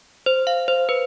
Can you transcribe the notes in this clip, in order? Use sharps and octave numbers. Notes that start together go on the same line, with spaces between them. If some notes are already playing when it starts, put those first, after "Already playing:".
C5
F5
C5
B4